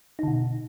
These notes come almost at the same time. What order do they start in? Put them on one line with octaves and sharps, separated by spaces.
D#4 D3 B2